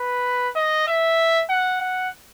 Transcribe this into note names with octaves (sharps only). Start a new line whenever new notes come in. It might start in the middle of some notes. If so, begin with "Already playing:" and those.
Already playing: B4
D#5
E5
F#5
F#5